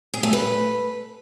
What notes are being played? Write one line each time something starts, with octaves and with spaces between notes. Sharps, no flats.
G#4
A3
B4